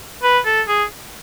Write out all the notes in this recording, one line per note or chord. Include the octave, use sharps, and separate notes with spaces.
B4
A4
G#4